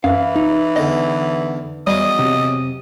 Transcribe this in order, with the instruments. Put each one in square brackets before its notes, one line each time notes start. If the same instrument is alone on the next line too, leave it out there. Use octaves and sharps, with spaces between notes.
[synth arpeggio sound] F#2 [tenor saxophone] E3 [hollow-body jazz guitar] F5
[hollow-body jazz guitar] D#4
[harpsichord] E2 D3 [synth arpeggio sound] D#5
[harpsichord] E2 F#3 [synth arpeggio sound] G3 [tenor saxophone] D#5
[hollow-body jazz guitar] C3